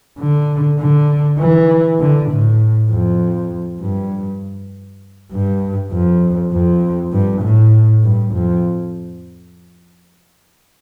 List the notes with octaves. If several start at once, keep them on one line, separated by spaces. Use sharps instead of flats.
D3
D3
E3
D3
A2
F2
G2
G2
F2
F2
G2
A2
G2
F2